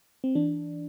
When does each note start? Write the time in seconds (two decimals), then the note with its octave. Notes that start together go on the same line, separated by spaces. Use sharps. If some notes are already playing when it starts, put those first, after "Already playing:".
0.24 C4
0.35 E3 D4